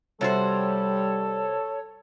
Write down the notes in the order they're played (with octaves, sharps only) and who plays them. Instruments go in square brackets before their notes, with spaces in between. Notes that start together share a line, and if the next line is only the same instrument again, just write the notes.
[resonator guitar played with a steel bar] C3 F#4 C5 [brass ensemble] G3 [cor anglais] A4 [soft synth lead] C#5